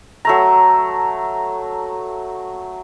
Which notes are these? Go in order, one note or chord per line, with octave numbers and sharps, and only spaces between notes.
F#3 A3 A#5